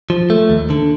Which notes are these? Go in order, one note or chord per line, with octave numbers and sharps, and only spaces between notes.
F3
A3
D#2
D3